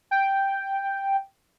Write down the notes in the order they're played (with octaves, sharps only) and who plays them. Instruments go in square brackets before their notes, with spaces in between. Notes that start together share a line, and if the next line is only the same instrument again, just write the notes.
[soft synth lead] G5